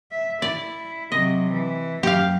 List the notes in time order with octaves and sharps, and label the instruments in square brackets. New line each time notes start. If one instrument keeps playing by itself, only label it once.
[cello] E5
[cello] E4 [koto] D5
[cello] C3 F#3 [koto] D#5
[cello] E3
[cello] F#2 F#3 [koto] G4 F5